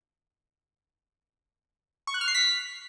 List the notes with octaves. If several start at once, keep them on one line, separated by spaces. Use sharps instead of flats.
C#6
F#6
F6
C7
B6